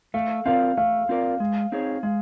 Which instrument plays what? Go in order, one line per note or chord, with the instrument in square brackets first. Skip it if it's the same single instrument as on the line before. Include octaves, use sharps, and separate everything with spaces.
[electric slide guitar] A3 [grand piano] F5
[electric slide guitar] C4 F4 A#4 D5 [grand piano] F5
[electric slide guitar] A3 [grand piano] F5
[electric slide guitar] C4 F4 A#4 D5
G#3
C4 D#4 G#4 C#5
[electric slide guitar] G#3 [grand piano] F5